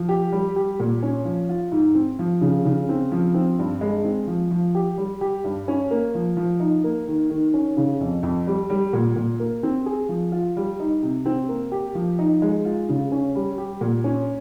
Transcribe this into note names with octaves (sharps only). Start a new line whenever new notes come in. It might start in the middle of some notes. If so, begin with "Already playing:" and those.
Already playing: F3
G4
G3
G4
A#2
C#4
F3
F4
G#2
C4
F3
C#3
C#3
C4
F3
C4
G2
G#3
C4
F3
F3
G4
G3
G4
G2
C#4
A#3
F3
F3
D#4
A#3
D#3
D#3
C#4
C#3
F2
F2
G3
G3
A#2
A#2
A#3
C4
G#4
F3
F4
G3
D#4
C3
C4
A#3
G4
F3
D#4
G#3
F4
C#3
C#4
G3
G4
A#2
C#4